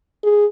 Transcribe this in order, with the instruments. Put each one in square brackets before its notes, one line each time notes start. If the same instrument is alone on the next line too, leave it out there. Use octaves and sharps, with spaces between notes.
[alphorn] G#4